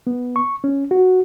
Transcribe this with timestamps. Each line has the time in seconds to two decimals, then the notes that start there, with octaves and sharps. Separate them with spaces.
0.07 B3
0.36 C#6
0.64 C#4
0.91 F#4